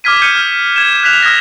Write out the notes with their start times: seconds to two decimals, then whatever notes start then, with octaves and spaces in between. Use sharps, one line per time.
0.04 D6 D#6 F6 G#6 B6 D#7
0.22 F6 G6 G#6 C#7 D#7
0.35 F6 B6
0.76 G#6 E7
1.03 F#6 G#6 B6 E7 F7
1.22 D#6 F6 G#6 A#6